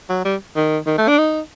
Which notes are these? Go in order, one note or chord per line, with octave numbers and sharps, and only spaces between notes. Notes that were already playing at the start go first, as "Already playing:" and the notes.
F#3
G3
D#3
D#3
A3
D4
D#4